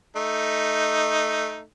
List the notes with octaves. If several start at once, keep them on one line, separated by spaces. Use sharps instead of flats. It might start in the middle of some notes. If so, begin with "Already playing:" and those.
A3 D#4